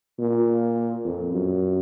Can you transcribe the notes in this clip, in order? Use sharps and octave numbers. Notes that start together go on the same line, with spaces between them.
A#2
F2
F#2